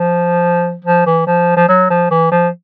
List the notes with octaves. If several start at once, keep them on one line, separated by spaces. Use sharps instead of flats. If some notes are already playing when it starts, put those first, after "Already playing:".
Already playing: F3
F3
E3
F3
F3
F#3
F3
E3
F3